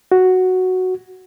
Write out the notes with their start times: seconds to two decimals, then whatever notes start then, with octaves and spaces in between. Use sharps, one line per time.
0.12 F#4